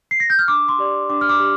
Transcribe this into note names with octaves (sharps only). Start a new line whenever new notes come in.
C7
A#6
G6
F6
D4 D6
C6
G4 D5
D4 D6
F6
D6
G4